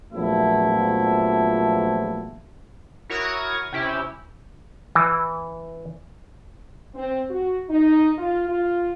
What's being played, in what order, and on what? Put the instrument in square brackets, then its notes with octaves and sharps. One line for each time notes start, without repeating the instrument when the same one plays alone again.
[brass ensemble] A#1 E2 F3 F#3 A3 E4
[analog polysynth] E4 F#4 A#4 C#5 C#6 D#6
C3 C#4 E4 G4
[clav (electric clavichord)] E3
[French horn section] C4
F#4
D#4
F4
F4